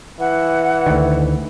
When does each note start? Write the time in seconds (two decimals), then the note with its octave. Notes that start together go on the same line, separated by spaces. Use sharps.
0.20 E3 F#5
0.86 D2 D#3